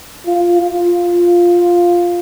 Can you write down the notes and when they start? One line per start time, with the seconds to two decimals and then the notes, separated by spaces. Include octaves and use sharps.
0.27 F4
0.61 F4